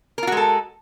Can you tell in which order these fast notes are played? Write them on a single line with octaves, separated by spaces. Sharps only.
A#4 F4 F#4 G#3 A4